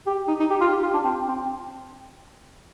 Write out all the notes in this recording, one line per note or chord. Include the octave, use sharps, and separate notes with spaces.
G4
D#4
D#4
G4
F4
G4
F4
D4
C4
C4